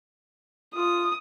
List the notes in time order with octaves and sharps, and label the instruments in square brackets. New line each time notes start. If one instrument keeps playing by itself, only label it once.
[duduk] F4 [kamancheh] D#6